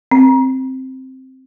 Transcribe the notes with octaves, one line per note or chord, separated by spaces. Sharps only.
C4